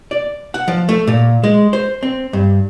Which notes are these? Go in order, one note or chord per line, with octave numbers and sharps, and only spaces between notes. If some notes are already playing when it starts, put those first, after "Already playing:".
D5
F#5
F3
A3
A#2
G#3
C5
C4
G2